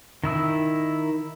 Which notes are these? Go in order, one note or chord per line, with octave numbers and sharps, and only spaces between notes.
D#3 E4 E6